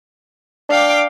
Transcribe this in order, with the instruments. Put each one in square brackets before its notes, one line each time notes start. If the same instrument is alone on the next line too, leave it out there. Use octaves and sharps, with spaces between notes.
[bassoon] D4 [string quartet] F5 G5 D6